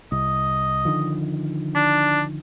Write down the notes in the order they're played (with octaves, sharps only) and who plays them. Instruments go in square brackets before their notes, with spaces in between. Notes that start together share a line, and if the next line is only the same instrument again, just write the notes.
[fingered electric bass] C2 [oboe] D#5
[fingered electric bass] D3 D#3 F3
[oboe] D4